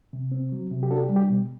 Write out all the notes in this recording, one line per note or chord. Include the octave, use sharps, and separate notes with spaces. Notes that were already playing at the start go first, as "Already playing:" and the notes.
C3
C4
F#3
C3
G4
D4 F#4 A4
G4
G3
G4
B2